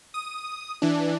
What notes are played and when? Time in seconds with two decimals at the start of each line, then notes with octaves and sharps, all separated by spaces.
0.14 D#6
0.82 E3 D4